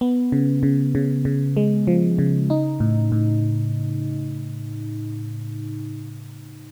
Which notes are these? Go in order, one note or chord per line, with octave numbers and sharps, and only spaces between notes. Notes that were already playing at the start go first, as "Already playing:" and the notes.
B3
C#3
C#3
C#3
C#3
G#3
F3
C#3
D#4
A2
A2